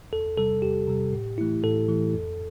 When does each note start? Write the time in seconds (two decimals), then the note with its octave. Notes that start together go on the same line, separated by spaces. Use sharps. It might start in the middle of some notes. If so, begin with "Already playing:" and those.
0.12 E2 A4
0.37 C3 G3 A4
0.62 E2 G4
0.88 C3 G3
1.13 A2
1.38 E3 A3 E4
1.64 A2 A4
1.88 E3 A3 E4
2.13 F2